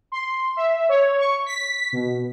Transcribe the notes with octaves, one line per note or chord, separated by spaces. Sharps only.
C6
E5
C#5
C#6
B6
B2